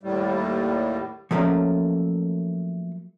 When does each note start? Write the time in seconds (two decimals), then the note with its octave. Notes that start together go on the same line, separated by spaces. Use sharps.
0.03 D#2 A2 G3
1.31 F3 F#3 A3 A#3 C#4